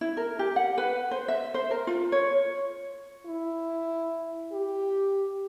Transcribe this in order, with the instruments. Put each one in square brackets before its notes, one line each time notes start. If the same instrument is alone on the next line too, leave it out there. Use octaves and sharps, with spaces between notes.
[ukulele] E4
A#4
G4
F#5
B4
C5
E5
C5
A#4
F4
C#5
[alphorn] E4
G4